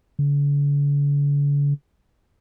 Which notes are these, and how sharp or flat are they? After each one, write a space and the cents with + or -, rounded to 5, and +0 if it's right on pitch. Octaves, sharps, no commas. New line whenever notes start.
D3 -45